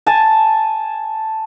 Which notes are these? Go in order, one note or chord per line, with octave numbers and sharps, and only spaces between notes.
G#5 A5